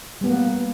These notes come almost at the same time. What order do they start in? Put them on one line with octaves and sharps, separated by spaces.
G3 B3 A#3